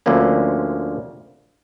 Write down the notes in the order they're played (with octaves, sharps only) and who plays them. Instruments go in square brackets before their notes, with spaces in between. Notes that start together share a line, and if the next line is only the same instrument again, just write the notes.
[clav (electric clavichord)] D2 D3 F3 A#3 C#4